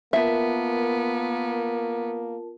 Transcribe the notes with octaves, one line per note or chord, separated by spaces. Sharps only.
A#3 B3 F4 A#4 E5 A5